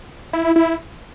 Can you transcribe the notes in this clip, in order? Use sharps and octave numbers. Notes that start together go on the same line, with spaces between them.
E4
E4
E4